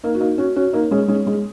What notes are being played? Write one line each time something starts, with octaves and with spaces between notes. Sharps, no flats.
A#3 D#4
F#4
A#3 D#4
C#4 F#4
C#4 F#4
A#3 D#4
G#3 C#4
G#3 C#4
G#3 C#4